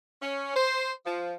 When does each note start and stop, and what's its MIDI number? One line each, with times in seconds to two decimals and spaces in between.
0.21 0.53 61
0.55 0.91 72
1.05 1.34 53